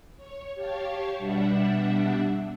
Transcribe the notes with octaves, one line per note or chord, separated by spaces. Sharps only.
C#5
G4 C#5 F5 A5 C#6
B2 G3 D4 E5 F#5